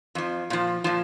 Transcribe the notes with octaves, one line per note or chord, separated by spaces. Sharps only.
F2 F3
A#2 F3
A#2 F3